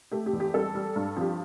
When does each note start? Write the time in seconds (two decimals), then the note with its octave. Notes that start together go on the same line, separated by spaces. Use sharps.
0.11 A3 G4
0.26 G4
0.33 E2
0.40 G4
0.54 G3 A4
0.75 G3
0.96 G2
1.16 F3 G4